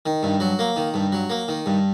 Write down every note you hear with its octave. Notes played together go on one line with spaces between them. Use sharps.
D#3
G2
F#3
A#3
D#3
G2
F#3
A#3
D#3
G2